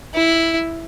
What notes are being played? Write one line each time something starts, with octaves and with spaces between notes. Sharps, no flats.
E4